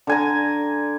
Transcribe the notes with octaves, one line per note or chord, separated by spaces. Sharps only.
D3 G#5 A#5